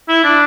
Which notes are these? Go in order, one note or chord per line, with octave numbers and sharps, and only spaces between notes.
E4
D4